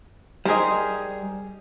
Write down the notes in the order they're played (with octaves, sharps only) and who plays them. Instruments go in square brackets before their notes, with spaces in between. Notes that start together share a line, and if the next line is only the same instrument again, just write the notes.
[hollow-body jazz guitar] G3 G4 G#4 [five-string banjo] D#4 A#4 C5